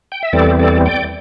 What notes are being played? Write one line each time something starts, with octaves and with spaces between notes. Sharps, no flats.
G5
E5
E2 E3 G3 C4 A4 D5
A4 D5
D5 G5